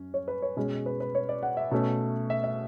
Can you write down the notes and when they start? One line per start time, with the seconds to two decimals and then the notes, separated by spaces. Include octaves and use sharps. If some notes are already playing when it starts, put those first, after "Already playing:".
Already playing: F#2 C#4
0.14 C#5
0.28 B4
0.42 C#5
0.57 B2 G#3 C#4
0.86 B4
1.00 B4
1.15 C#5
1.29 D5
1.43 F#5
1.57 E5
1.71 B2 A3 C#4
2.30 E5
2.44 E5